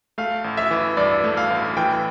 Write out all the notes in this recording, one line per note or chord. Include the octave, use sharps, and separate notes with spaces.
A3 F5
A1
E5
E3
G2 D5
A3
F5
A1
E3 G5